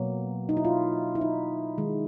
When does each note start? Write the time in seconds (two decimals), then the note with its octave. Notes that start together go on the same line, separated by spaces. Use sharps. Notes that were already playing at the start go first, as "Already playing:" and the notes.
Already playing: B2 F#3 A#3
0.49 D#4
0.57 E4
0.65 F4
1.15 E4
1.21 D#4
1.78 D#3 G#3